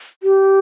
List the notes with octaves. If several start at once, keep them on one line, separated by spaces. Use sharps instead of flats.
G4